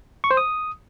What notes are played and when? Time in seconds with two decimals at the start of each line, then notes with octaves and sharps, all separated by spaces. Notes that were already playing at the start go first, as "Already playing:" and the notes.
0.24 C#6
0.31 C5
0.37 D#6